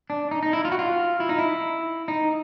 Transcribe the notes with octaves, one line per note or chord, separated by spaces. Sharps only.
D4
D#4
D#4
E4
F4
F#4
F4
E4
D#4
E4
D#4